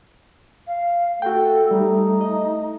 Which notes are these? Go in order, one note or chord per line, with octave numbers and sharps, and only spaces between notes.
F5
A3 F#4 A4 G5
G3 D#4
D#5